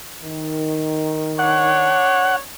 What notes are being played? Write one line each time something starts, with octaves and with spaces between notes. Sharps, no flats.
D#3
D4 C#5 F#5